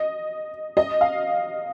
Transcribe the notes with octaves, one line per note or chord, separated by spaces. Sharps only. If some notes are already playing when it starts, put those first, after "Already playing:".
Already playing: D#5
D#5
F5